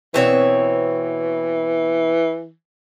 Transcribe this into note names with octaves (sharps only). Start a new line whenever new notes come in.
B2 E3 C4 C#5